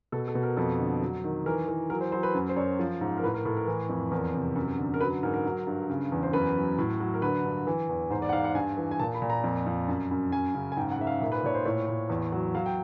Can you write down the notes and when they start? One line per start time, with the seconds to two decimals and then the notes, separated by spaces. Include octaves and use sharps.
0.12 B2 A4
0.28 A4
0.35 B2
0.43 A#4
0.57 F2 A4
0.79 D3
1.02 F#3
1.24 D#3
1.46 E3 A#4
1.68 E3
1.90 F#3 A#4
2.01 C5
2.12 F#3 C5
2.23 B4
2.34 F#2
2.49 C5
2.56 F#2 C#5
2.79 F3
3.01 G#2
3.18 A#4
3.23 A2 B4
3.34 A#4
3.45 A2 A4
3.57 A#4
3.67 E3
3.89 F2
4.11 E2 A#4
4.34 C3
4.56 F#2
4.78 D3
4.94 A#4
5.01 F#3 B4
5.23 G#2 A#4
5.34 A#4
5.45 F#3
5.67 G2
5.89 C#3
6.12 E2
6.23 C5
6.33 F#2 B4
6.55 F#3
6.78 A2
7.00 F#3
7.14 A#4
7.22 D3 B4
7.45 G2
7.67 E3
7.89 E2
8.10 G#2 C5
8.22 D5
8.29 F#5
8.33 G#2 F5
8.44 F#5
8.55 G2 G#5
8.77 E3
8.91 G#5
9.00 A#2 A5
9.15 B5
9.22 A#2
9.30 A#5
9.44 F2
9.66 F2
9.88 F#2
10.11 F#2
10.32 F#2 G#5
10.55 C#3
10.72 G#5
10.77 G#2 G5
10.91 F#5
10.99 G#2 E5
11.07 F5
11.21 A#2 E5
11.32 B4
11.44 A#2 C#5
11.54 C5
11.65 A2 C#5
11.88 A2
12.09 E2
12.32 F#3
12.55 F#3 F5
12.66 G5